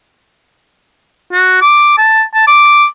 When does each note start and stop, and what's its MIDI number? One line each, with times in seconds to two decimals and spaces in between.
1.33 1.57 66
1.61 1.96 86
1.98 2.23 81
2.34 2.44 81
2.47 2.86 86